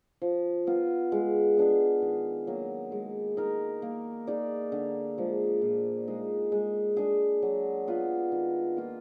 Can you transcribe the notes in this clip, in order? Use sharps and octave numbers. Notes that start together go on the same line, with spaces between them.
F3
B3 F4
G#3
B3 D4 G#4
D#3
F#3 A#3
G#3
D#4 A#4
A#3
D#4 G#4 D5
D3
F3 G#3
A#2
G#3 D#4
G#3
D4 G#4
F#3
B3 F4 B4
D#3
A#3 F4